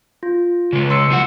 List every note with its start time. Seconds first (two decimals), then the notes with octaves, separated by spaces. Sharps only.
0.23 F4
0.73 C#3 G#3
0.90 C6 E6 C#7
1.10 G3 F4 F#5